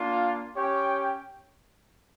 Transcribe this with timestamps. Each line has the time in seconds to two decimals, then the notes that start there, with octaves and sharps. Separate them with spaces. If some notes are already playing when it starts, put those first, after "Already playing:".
Already playing: A#3 D4 F4
0.56 C#4 G4 C#5 G5